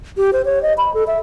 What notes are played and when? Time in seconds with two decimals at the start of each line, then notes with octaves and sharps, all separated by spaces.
0.17 G4
0.33 C5
0.45 C#5
0.63 D#5
0.78 B5
0.94 A4
1.07 E5